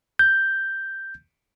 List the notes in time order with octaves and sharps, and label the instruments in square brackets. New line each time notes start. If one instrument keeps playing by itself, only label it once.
[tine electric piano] G6